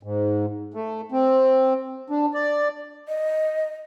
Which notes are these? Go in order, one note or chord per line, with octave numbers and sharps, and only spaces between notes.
G#2
A3
C4
D4
D5
D#5